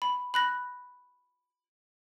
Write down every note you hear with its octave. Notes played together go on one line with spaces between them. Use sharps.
B5
B5 F#6 A#6